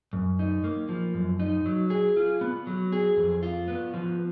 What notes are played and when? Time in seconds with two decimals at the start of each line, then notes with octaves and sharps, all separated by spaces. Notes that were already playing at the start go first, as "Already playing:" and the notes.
0.13 F#2
0.39 D#4
0.64 A#3
0.89 F3
1.14 F#2
1.40 D#4
1.66 F#3
1.90 G#4
2.16 F4
2.41 B3
2.67 F#3
2.92 G#4
3.17 F2
3.43 F4
3.68 B3
3.94 F3